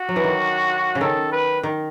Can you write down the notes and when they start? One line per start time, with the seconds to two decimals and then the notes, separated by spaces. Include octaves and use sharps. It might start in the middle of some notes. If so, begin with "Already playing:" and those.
Already playing: F#4
0.09 F#3
0.16 E3
0.24 D#3
0.95 C#3
1.01 D#3 A4
1.32 B4
1.63 D#3